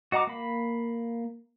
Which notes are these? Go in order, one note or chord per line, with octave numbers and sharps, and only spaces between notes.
F#4 D#5 F#5 A#5 D6
A#3 B5